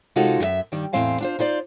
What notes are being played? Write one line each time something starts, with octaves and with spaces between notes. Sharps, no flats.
C3 G#3 D#4 F4 F#4 A4
F#2 G#4 E5
G2 D#3 G3
E2 A2 C4 C5 F5 G#5
D4 F4 C5
D#4 F4 C5 D5